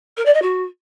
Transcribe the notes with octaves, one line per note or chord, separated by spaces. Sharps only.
A#4
D5
D#5
F#4